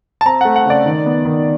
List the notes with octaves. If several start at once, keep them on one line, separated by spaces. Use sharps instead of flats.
A5
C4 A#5
A3 F#5
F#5
C#3 D5
D#3
B3
D#3